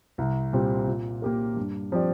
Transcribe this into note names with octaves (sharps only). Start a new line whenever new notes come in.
C2
A#2 G3 C4
A#2
A#3 G4 A#4
G2
F3 C4 G4 D5